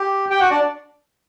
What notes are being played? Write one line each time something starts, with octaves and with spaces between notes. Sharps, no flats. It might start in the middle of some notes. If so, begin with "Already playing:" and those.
Already playing: G4
G4 G5
F#4 F#5
D4 D5